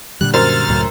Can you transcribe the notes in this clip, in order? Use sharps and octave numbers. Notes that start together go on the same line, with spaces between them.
A#2 D3 G3 F#6
F#2 A#4 C5 F6 A6
C#2 A2 F#3